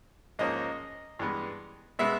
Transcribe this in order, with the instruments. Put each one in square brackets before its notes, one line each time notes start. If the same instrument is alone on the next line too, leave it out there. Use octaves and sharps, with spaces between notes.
[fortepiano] G#2 F3 A#3 C#4 D#5
G2 E3 G#3 B3
B2 G#3 B3 E5